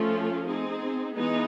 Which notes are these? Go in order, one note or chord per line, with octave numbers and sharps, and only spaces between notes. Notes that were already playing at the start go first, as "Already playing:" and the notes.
Already playing: F3 A3 C#4 F4 A4
C4 D#4 G#4
E3 G#3 B3 D#4